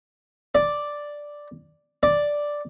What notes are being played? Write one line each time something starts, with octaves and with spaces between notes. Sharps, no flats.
D5
D5